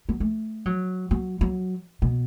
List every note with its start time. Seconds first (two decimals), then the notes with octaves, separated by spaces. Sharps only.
0.09 F#3
0.20 A3
0.66 F#3
1.11 F#3
1.41 F#3
2.02 B2